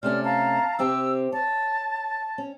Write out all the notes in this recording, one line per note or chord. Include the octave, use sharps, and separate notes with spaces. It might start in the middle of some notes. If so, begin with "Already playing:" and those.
C3 A3 C#4 D5 F6
F5 A5 A#5
C3 C4 G4 E6
C#5 A5
C#4